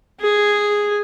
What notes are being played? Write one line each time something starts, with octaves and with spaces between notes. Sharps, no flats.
G#4